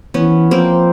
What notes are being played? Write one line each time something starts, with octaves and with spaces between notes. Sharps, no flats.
E3 B3 C#4
F3 A#3 C4